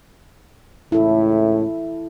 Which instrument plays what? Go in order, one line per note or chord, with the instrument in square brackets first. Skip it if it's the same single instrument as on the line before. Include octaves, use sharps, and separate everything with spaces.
[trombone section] C#2 A2 [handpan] E4 A4